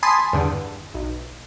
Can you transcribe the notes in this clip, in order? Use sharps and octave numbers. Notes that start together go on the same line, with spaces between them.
G#5 A5 B5 C6 D#6
E2 G2 D3
B1